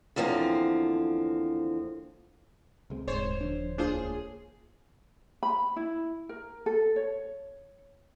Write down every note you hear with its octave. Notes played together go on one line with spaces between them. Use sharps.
E2 D3 F3 A#3 C4
C#2 G#3 C4
D#1 G#2 C5 C#5
D3 F3 D4
C#2 A#3 D4 F4 G#4 C5
B5
E4
A#4
A4
C#5